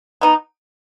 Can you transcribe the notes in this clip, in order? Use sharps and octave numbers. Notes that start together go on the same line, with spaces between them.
B3 D#4